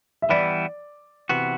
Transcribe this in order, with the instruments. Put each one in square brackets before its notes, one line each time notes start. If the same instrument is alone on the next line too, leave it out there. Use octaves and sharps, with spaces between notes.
[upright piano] E5
[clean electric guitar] E3 G3 B3 E4 [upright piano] D5
[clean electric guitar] C3 E3 B3 F#4